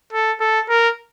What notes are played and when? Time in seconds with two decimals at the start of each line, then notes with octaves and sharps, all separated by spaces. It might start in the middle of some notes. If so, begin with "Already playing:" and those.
0.13 A4
0.41 A4
0.69 A#4